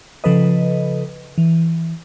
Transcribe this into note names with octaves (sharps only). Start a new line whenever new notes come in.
C#3 F3 A4 B4 D#5
E3